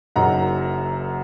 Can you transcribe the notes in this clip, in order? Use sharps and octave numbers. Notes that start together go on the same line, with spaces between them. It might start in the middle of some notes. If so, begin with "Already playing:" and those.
F#1 F#2 F#3 D#4 F#5 A#5